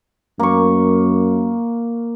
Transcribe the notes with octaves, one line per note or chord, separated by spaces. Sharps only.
F#2 A#3 C#6